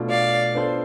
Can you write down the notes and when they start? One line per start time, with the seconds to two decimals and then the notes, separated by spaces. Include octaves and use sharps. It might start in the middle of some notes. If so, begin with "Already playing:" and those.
Already playing: B2 A3 D4 F4
0.10 D5 F5
0.54 B3 D4 F4 A4 C5